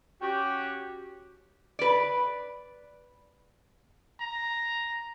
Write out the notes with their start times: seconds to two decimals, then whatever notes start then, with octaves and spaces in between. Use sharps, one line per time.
0.21 C#4 F#4 G4
1.79 B4 D5
4.20 A#5